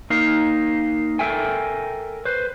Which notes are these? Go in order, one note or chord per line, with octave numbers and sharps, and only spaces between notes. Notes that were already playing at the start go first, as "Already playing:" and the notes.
A#3 D#4 A#4 F5
A4 A#4 E5 G5 G#5
B4 C5